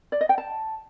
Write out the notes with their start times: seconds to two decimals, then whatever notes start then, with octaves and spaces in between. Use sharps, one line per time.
0.12 D5
0.21 D#5
0.29 G5
0.38 A5